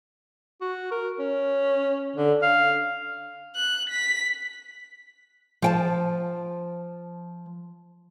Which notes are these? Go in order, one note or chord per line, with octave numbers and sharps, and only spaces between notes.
F#4
A#4
C#4
D3
F5
F#6
B6
F3 G5 A5